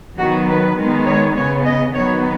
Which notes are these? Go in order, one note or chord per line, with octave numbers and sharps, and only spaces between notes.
D#3 F#3 B3 F#4
B4
D#3 G#3 B3
C#5
C#3 B3 C#5
D#5
D#3 F#3 B3 C#5